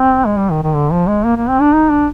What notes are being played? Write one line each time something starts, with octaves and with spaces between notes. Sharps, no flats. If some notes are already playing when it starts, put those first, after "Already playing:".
Already playing: C4
G#3
G3
D#3
D#3
D3
F3
G#3
A#3
A#3
C4
D4
D#4
D4